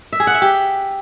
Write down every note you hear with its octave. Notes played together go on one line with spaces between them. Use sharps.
E5
G#4
F#5
E5
G4